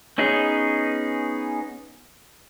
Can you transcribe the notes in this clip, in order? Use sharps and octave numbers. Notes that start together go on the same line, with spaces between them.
B3 C#4 D#4 G#4 D#5